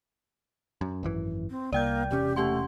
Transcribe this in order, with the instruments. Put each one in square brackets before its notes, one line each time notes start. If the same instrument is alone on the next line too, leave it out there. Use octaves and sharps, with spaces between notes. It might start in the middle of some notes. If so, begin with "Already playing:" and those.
[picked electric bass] F#2
G#1 F#2 E3
[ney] C4
[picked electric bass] C2 [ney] A#3 [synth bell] D5 G5 G6
[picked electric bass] E1 C3 C#4 [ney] G4
[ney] A3 [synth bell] G4 F#5 C6